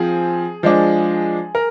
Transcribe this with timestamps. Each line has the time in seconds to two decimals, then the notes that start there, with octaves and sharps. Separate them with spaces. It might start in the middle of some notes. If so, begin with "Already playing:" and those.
Already playing: F3 C4 G#4
0.63 F3 G#3 D4
1.55 A#4